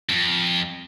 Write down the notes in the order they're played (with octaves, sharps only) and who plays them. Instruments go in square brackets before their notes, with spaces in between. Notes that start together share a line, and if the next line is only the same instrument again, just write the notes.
[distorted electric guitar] F2